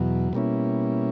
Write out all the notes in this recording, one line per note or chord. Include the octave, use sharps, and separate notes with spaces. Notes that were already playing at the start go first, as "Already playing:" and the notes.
Already playing: E2 B2 F#3
B2 G3 A#3 C#4 E4